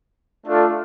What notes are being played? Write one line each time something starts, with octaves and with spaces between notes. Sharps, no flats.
A3 D4 F4 A4